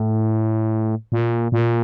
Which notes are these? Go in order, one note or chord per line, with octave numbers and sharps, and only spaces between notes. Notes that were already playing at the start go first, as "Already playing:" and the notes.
Already playing: A2
A#2
A#2